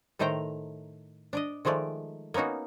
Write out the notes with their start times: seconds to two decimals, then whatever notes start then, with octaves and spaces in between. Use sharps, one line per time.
0.19 A2 D#3 A3 C5 G5 A#5
1.33 D4 D5 D#5
1.65 D#3 F3 G#3 A3 D5
2.34 A#3 B3 C#4 D#4 F#4